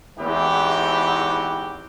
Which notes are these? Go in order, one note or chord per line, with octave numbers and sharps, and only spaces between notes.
E2 G#2 C4 E4 F#4 G4